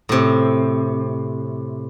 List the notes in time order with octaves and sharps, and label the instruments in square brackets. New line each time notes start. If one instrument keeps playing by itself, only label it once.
[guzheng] A2 C3